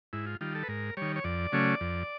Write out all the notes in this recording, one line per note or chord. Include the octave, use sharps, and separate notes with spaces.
G#2 E4
F4
D#3 G3 F4
A4
B4
G#2 A#4
D#3 G3 C#5
C#5
F2 D5
C#3 F#3 A3 C#4
F2